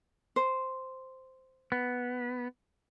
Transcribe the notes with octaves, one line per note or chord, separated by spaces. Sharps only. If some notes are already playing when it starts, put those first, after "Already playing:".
C5
B3